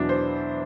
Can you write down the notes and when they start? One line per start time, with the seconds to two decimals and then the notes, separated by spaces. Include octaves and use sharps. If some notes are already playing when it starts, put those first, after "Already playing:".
Already playing: E2 B2 F#3 D4 E4
0.09 C5